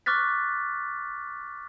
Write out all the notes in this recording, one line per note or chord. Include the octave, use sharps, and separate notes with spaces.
C#6 D6 F6 F#6 A6 B6